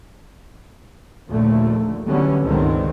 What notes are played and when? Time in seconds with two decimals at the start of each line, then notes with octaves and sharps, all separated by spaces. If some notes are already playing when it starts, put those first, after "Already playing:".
1.30 A#1 D#2 A#2 D3 A3
2.07 D3 E3 F#3 G3 B3 C#4
2.44 C#2 G2 D3 D#3 B3 C4